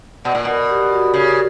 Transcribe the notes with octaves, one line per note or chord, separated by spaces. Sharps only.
B2 D5
A#2
B2 A#4
G4
F#4
C#3 G4